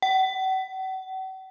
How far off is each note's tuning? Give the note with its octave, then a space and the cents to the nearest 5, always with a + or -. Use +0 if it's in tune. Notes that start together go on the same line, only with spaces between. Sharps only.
F#5 +40